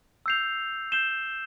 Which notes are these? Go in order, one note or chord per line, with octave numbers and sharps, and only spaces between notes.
E6 G6 C7 F7
G6 C7 E7 G7